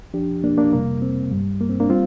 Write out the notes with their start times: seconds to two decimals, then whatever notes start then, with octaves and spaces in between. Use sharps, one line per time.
0.14 F3 D4 G4
0.18 F2
0.44 A#3 D4
0.58 A#3 D4
0.72 F2 C3 G3 A#3
1.02 C4
1.31 G2 G3
1.60 A#3
1.69 C4
1.80 A#3 D4
1.89 G3 C4 F4